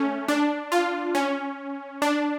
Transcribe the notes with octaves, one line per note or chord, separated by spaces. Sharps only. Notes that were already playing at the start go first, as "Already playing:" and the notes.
Already playing: A3 C#4
D4
F4
C#4
D4